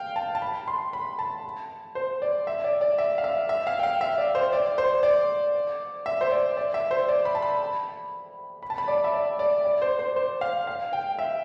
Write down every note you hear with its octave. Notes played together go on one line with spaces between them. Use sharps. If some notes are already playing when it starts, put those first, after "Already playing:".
Already playing: F5 G5
A5
A5
B5
C6
B5
A5
C5
D5
E5
D5
D5
E5
F5
E5
E5
F5
G5
F5
E5
D5
C5
D5
C5
D5
E5
C5
D5
D5
E5
C5
D5
B5
A5
B5
B5
A5
B5
D5
E5
D5
D5
D5
C5
C5
C5
F5
F5
G5
E5